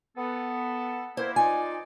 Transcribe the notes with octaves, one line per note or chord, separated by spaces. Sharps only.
B3 A4
A#3 E4 C5
D#4 F4 D5 G#5